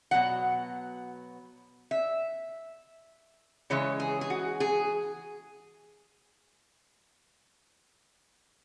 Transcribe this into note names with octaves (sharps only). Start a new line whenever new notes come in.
B2 F#3 F#5
E5
C#3 E3 G#3 C#5
G#4
G#4
F#4
G#4